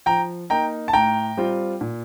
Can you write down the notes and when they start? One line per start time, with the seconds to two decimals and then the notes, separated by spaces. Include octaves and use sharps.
0.06 F3 G5 A#5
0.50 A#3 D#4 G5 A#5
0.88 A5
0.93 A2 G5 A#5
1.37 G3 C4 F4
1.81 A#2